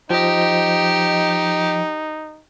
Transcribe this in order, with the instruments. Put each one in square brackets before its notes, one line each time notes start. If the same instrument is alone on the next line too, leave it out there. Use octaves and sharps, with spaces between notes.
[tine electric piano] F3 D#5 [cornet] D#4 [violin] G4